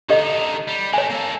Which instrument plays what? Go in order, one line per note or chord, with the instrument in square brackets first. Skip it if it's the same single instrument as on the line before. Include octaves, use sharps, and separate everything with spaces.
[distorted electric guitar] D3 D#4 [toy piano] G4 A4 D#5
[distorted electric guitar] G3
[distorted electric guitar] G#3 A3 [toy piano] C#5 G#5
[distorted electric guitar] A#3 A4